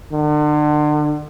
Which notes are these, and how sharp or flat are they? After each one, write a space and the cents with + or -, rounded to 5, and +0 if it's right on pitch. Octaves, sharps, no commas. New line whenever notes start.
D3 +35